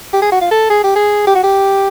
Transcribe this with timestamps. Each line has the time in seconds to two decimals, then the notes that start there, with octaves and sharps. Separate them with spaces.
0.13 G4
0.22 G#4
0.32 F#4
0.41 F4
0.51 A4
0.70 G#4
0.83 G4
0.96 G#4
1.27 G4
1.35 F#4
1.43 G4